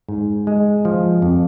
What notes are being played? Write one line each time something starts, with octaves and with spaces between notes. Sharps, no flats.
G#2
G#3
F3
F2